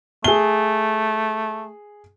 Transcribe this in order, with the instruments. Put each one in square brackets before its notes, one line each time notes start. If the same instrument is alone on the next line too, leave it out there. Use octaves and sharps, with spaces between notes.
[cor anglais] A3 [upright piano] G#4 G7